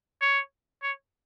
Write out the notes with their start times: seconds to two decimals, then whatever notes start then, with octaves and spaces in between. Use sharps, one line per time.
0.21 C#5
0.82 C#5